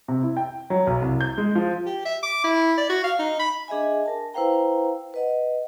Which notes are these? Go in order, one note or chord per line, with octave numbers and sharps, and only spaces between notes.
C3
E4
G5
F#3
B1
C2
G6
G#3
F3
G4
E5
D6
E4
D5
F#4
F5
D#4
B5
D4 G#4 D#5 E5 G#5
A#4 A5
E4 B4 C5 F5 G5 A#5
B4 D#5 F#5